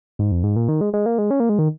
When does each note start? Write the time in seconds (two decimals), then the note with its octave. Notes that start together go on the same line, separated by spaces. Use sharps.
0.19 G#2
0.32 F2
0.44 G#2
0.56 A#2
0.69 D#3
0.81 G#3
0.93 G#3
1.06 A#3
1.18 G#3
1.31 C#4
1.40 A#3
1.49 G#3
1.59 D#3